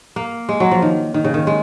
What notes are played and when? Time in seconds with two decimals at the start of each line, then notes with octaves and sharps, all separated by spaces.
0.16 A#3
0.49 G#3
0.60 F#3
0.71 F3
0.82 D#3
1.14 D#3
1.24 C#3
1.34 D#3
1.47 G#3